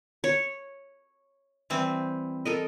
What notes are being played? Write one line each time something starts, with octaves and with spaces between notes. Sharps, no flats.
C#5
E3 G3 C4
A4 A#4 D#5